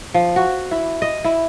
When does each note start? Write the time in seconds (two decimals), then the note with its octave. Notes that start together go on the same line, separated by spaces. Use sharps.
0.14 F3
0.36 F#4
0.71 E4
1.02 D#5
1.25 E4